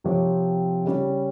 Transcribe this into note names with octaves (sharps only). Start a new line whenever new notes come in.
C3 F3 C4 G4 C#5
C#3 G3 C#4